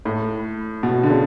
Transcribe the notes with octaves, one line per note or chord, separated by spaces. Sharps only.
A2
B2
D3
C#3